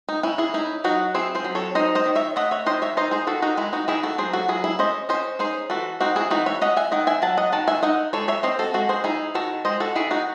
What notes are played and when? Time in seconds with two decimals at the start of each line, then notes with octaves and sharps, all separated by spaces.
0.09 D#4
0.23 C#4 E4
0.38 E4 G#4
0.54 D#4 E4
0.84 F#3 D#4 F#4
1.15 C4 E4 G#4
1.35 G#4 C5
1.45 F#3
1.55 A4 C#5
1.75 D#4 C5 D#5
1.95 C5 D#5
2.06 D#3
2.15 C#5 E5
2.36 A3 D#5 F#5
2.51 C#5 E5
2.66 D#3 C5 D#5
2.82 C#5 E5
2.97 D#4 C5 D#5
3.11 G#4 C5
3.27 D#3 F#4 A4
3.42 D#4 F#4
3.57 G#3 E4
3.73 D#4 F#4
3.88 D#3 E4 G#4
4.03 F#4 A4
4.18 F#3 G#4 C5
4.33 F#4 A4
4.49 F#3 E4 G#4
4.64 E4 G#4
4.79 C#4 C5 D#5
5.09 C#4 C5 D#5
5.39 D#4 G#4 C5
5.70 E3 F#4 A4
6.00 C4 D#4 F#4
6.15 E4 G#4
6.31 E3 D#4 F#4
6.46 C#5 E5
6.61 C#4 D#5 F#5
6.76 E5 G#5
6.92 D#3 D#5 F#5
7.07 E5 G#5
7.22 F#3 F#5 A5
7.37 D#5 F#5
7.52 D#3 F#5 A5
7.68 E5 G#5
7.83 D#4 D#5 F#5
8.13 G#3 A4 C#5
8.28 C#5 E5
8.43 C4 C5 D#5
8.59 F#4 A4
8.74 G#3 F#4 A4
8.89 G#4 C5
9.04 D#4 E4 G#4
9.35 D#3 F#4 A4
9.65 G#3 C5 D#5
9.80 F#4 A4
9.95 D#3 E4 G#4
10.11 D#4 F#4